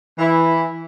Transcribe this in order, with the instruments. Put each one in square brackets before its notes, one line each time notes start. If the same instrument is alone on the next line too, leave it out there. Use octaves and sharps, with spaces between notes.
[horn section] E3 E4